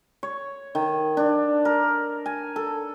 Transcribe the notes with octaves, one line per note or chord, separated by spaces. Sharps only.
C#5
D#3
D4
A#4
G#5
A4